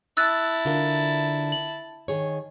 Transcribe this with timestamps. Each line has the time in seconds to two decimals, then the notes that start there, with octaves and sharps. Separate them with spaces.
0.17 E4 A5 E6 F#6 A6
0.65 D3 F4 A#4
1.52 F#7
2.08 D#3 G#4 C#5